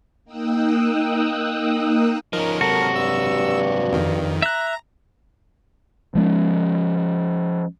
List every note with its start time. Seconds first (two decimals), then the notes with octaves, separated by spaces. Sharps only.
0.24 A#3 D#4 G5 D#6 E6 F#6
2.33 F3 C#4 D#4 A#4
2.61 C3 F#3 F#4 A4
2.96 G2 E6
3.93 F2 D#3
4.42 E5 A#5 F#6
6.15 F3 G#3 C#4